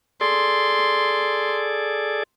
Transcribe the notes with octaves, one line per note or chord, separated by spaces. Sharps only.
G#4 A4 D5 C6